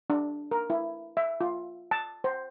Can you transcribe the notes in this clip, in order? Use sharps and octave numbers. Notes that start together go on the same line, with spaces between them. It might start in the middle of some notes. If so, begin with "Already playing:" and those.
D4
A#4
E4
E5
F4
A5
C5